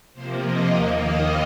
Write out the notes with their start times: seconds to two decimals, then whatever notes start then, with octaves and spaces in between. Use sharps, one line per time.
0.14 C3 F3 A#3 C5
0.42 D#5
0.69 D#2 D#3 A#3 F#5
0.98 D#5